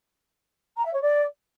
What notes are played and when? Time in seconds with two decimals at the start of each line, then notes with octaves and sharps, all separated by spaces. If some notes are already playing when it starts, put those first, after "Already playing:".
0.76 A#5
0.85 E5
0.93 C#5
1.01 D5